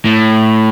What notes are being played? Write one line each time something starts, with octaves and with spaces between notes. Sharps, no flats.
A2